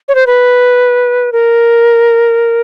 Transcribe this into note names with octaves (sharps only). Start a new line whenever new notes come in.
C#5
C5
B4
A#4